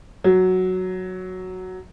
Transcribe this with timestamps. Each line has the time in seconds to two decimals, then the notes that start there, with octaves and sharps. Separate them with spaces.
0.24 F#3